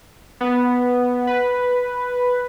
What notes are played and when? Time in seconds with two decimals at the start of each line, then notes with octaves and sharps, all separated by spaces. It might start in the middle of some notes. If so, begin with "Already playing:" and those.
0.41 B3
1.27 B4